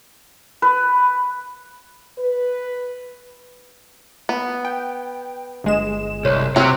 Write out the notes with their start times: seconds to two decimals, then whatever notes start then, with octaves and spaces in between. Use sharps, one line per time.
0.62 B4
2.18 B4
4.29 B3
4.65 G5
5.64 G1 G#3 E7
6.25 C2 C#5
6.56 C3 F#3 C4 A#5 F6 F#6